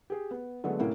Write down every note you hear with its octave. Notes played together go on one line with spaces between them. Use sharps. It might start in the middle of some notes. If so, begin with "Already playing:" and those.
G4 G#4
B3
D3 F#3 G#3 A3 B3
A2 C3 A3 A#3 C#4 E4